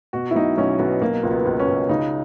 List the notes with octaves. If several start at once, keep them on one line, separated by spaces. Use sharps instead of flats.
B2 F#4
E4
B1 D#4
B1 C#4
B1 B3
B2 A#3
C#2
B3
C#2
C#4
C#2
C#3 D#4